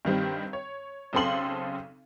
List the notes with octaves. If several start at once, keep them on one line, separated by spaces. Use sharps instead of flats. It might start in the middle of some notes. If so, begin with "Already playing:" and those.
G2 D#3 G3 C4
C#5
B1 C#3 C4 A4 C6 F#7